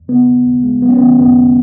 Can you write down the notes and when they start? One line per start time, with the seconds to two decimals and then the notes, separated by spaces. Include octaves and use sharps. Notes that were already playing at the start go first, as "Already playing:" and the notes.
Already playing: E2
0.08 C#3 B3
0.27 D#2
0.46 D#2
0.64 G#3
0.82 F#3 B3
0.90 C#4
0.97 D#3 B3
1.19 F#2 B3